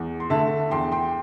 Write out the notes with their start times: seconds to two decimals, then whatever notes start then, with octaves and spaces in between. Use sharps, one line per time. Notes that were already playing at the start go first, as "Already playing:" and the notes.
Already playing: E2
0.20 C6
0.30 D3 A3 E5 A5
0.71 E2 G5 C6
0.92 G5 C6